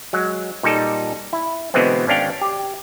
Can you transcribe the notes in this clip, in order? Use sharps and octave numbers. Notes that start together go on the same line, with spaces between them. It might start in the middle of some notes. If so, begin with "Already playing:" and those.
F#3 G#3
A#2 G3 D#4 A4
E4
B2 D3 E3 G#3 B3 C4
G#1 C#4 D4 F5 G5
G4